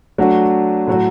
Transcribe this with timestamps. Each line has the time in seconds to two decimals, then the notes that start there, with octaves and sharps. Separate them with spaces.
0.18 F#3 A3 D4 F#4
0.87 A2 F#3 A3 F#4